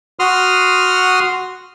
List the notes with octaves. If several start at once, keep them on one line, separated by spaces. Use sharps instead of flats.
F#4 C6 D#6 F6